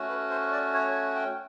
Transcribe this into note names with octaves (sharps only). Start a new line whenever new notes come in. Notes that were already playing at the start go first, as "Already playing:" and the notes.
Already playing: A3 C#4 F#4
B4
C5
D5
C#5
G5